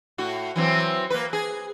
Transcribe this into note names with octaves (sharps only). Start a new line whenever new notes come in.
A2 F#4
E3 F#3 C4
A#3 B4
G#4